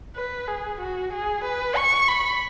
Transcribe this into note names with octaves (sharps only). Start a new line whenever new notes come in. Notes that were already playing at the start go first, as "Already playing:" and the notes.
B4
G#4
F#4
G#4
B4
C#6
B5